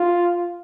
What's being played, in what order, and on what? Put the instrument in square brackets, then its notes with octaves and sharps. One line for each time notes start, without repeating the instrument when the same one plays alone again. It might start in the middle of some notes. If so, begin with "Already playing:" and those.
Already playing: [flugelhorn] F4